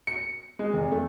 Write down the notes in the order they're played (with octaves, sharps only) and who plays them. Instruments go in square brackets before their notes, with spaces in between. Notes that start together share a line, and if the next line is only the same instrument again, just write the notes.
[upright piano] C#7
G#3
F1
A3